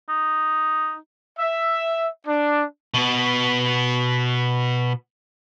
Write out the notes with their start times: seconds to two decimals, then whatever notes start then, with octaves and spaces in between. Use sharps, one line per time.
0.09 D#4
1.39 E5
2.27 D4
2.94 B2 B3